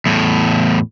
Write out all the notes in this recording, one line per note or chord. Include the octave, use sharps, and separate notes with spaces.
E2 A2